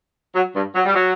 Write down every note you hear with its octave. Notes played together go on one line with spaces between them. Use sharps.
F#3
G2
F#3
G3
F#3